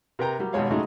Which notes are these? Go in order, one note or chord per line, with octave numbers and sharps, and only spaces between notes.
C3 A#4 B4 G5 A#5
F#3 G3 A#3
G#1 B2 G3 G#3 C#5 F5
G#2 C#3 G#3 A3 D#4 F#4